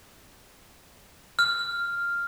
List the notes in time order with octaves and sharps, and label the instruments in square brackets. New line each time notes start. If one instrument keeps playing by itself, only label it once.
[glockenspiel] F6